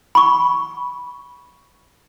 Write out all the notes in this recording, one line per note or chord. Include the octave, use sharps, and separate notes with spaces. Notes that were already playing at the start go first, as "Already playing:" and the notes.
B5 C#6